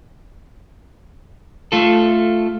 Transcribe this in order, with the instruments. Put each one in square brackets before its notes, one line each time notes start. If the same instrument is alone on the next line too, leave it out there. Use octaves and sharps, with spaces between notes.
[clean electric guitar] A3 F4 A4